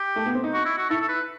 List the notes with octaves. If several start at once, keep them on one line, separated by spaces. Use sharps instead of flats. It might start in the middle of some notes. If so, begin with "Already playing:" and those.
Already playing: G4
A3
B3
C4
D#4
F#4
E4
F#4
E4 A4
A4
B4